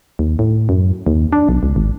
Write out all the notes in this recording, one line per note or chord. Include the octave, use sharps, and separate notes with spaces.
D#2
A2
F#2
D#2
D4
B1
C#2
G#1